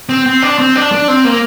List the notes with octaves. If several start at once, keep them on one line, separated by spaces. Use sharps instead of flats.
C4
C4
D4
C4
D4
D4
C4
A#3